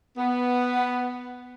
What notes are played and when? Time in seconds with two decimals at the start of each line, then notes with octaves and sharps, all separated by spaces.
0.18 B3